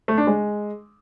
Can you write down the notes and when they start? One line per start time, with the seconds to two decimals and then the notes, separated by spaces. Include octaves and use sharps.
0.08 A3
0.18 D4
0.27 G#3